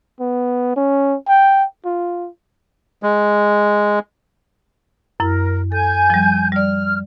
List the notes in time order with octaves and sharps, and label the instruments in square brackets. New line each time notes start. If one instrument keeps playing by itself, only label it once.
[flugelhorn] B3
C#4
G5
F4
[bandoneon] G#3
[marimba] F#2 E4 [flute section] A#4
[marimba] A4 [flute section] G#5 G6
[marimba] F3 G3
[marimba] G3 D5 [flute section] F6